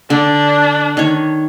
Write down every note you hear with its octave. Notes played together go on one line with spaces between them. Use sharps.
D3 D4
D#3 C#5